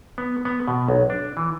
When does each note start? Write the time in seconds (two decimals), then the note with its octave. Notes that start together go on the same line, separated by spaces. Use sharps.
0.18 B3
0.45 B3
0.68 B2
0.88 B1
1.10 D4
1.37 E3